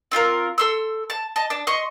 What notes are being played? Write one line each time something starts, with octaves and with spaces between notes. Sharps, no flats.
C4 F4 A4 A#4
A4 C6 E6
A5
D#5 A5
D4 A5
D#5 C6 C#6